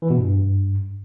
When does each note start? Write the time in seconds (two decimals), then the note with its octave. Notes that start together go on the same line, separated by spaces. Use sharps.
0.02 E3
0.10 B2
0.18 G2